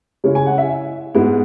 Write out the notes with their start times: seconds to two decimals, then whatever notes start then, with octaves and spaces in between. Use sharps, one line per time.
0.24 C#3 G#3 C#4 E4
0.35 G#5
0.46 F#5
0.58 E5
1.14 G#2 G#3 B3 E4